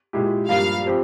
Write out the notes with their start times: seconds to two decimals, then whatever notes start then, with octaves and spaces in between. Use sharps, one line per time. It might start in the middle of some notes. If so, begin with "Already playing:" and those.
0.13 A#2 G#3 E4 G4
0.49 G2 F3 A#3 F5
0.86 F3 C4 G4